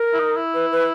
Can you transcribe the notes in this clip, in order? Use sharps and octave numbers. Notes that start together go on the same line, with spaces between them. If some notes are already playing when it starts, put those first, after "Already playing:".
Already playing: A#4
E4
D#4
E4
B4
B4